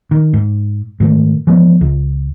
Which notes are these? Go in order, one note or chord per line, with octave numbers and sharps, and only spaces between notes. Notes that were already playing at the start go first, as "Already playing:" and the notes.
D#3
G#2
G#2 D#3 A3
E3 F3 G#3 B3
C#2